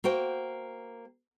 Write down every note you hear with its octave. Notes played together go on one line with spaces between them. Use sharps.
A#3 F#4 C5 G5